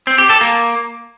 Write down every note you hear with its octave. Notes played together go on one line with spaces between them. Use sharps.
C4
G4
A4
A#3